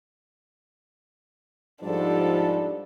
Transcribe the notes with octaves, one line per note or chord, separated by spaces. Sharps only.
G#2 F3 G3 D4 A4